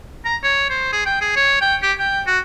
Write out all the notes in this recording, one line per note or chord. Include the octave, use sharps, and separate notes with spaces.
A#5
C#5
C5
G#4
G5
G#4
C#5
G5
G4
G5
F#4